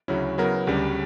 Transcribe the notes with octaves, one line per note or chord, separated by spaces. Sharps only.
D2 C#3 F#3 C#4 E4
C#3 F#3 B3 E4 A#4
D2 C#3 G3 C#4